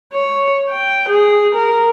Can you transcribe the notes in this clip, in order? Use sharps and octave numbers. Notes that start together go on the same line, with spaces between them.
C#5
G5
G#4
A#4